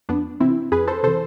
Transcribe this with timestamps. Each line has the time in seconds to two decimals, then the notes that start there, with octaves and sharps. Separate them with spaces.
0.09 F2 B3 D4
0.40 C3 E3 C4 E4
0.72 F2 G#4 B4
0.87 A4 C5
1.03 C3 A4 C5
1.07 E3